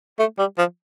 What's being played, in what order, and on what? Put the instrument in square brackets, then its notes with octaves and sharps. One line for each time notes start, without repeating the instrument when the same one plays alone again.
[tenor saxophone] A3
G3
F3